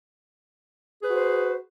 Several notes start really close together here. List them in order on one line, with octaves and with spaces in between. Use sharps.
G#4 B4 F#4 C5